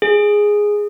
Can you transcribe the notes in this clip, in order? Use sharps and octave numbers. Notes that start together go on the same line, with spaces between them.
G#4